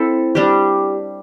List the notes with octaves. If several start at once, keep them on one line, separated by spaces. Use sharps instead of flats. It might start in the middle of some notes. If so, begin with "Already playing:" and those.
Already playing: C4 E4 A4
G3 D4 G4